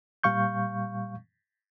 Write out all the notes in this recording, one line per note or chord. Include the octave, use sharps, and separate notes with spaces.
A#2 G3 F5 C#6 G6